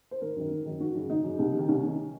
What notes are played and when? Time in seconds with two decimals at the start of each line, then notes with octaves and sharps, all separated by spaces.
0.11 C5
0.21 G#1 A#4
0.36 F#2 D#3
0.51 G#1
0.66 F#2 D#3
0.80 G#1 F#4
0.95 F#2 C#3
1.10 G#1 D#4
1.24 F#2 C#3
1.39 C2
1.54 C3 D#3
1.68 C2 C#4
1.83 C3 D#3